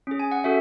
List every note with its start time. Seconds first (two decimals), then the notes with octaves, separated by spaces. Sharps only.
0.07 C#4 G#4
0.19 G#5
0.31 F#5
0.44 C#4 F#4 A4 E5